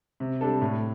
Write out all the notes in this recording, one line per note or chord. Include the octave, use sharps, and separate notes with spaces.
C3
G3 D4 A4
A2